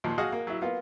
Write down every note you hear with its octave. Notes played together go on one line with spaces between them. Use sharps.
D#2 A#2 F3
F#4 G#4 D#5 F5
A#3
F#3 E4
A#3 B3 F4